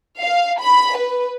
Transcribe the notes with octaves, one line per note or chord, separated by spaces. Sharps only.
F5
B5
B4